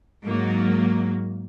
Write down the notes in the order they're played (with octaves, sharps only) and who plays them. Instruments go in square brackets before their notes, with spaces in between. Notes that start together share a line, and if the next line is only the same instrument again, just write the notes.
[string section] G#2 F#3 A#3